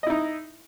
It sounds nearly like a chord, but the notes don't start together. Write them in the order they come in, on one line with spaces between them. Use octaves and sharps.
D#5 E4 D#4